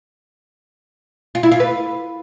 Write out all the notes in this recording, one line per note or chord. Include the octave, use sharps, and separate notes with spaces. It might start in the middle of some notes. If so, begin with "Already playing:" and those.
F4
E4
F4
B4